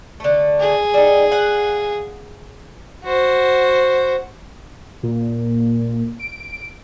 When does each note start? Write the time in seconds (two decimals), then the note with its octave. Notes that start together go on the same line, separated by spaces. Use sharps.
0.20 D3 A3
0.60 G#4
0.94 G3 D#4
1.32 F5 F#5
3.04 F#4 C5
5.03 A#2
6.20 D7